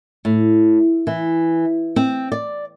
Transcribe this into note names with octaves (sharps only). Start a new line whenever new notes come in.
A2
E3
C4
D5